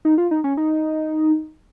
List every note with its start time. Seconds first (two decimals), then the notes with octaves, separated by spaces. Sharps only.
0.05 D#4
0.18 F4
0.31 D#4
0.44 C#4
0.57 D#4